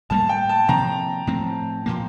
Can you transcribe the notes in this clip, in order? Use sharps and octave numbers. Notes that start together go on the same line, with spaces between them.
A2 G3 A#3 A5
G5
A5
C3 F3 A#3 A#5
A2 F3 C4
A#2 F3 A#3